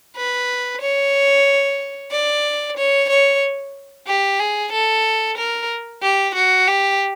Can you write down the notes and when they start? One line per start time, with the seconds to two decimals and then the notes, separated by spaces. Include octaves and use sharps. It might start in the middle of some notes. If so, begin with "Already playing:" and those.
0.16 B4
0.81 C#5
2.11 D5
2.77 C#5
3.09 C#5
4.07 G4
4.39 G#4
4.72 A4
5.37 A#4
6.02 G4
6.35 F#4
6.67 G4